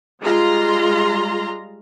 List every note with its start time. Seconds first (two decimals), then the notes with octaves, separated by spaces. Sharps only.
0.21 G3 G#3 F4 A#5 C6